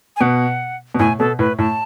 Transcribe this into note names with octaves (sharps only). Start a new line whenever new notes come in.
G#5
B2 F#5
B2
A2 G#5
B2 A4
A2 B4
A2 A5